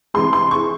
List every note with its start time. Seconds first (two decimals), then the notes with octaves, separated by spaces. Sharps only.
0.14 C3 E3 G#3 C6
0.33 C6
0.51 C#6